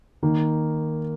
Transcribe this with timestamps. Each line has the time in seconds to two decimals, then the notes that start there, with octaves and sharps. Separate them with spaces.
0.22 D#3 A#3 D#4